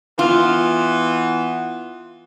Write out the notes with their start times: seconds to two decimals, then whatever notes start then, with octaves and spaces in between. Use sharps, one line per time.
0.19 E3 B3 F4